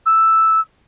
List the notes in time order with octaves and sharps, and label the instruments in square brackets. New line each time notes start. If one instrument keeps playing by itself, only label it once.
[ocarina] E6